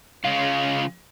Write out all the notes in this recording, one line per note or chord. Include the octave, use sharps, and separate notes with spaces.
C#3 G#3 F4 F5